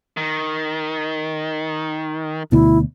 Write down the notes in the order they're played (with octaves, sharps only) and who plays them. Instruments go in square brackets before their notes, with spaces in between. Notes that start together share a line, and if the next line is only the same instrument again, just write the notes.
[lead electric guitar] D#3
[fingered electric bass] D2 B2 [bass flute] E4